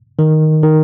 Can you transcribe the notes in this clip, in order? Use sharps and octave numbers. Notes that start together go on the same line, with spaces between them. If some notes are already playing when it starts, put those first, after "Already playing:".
D#3
D#3